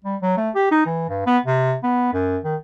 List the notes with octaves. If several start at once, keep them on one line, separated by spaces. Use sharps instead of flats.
G3
F#3
A3
G4
D#4
E3
G2
B3
C3
B3
F#2
D#3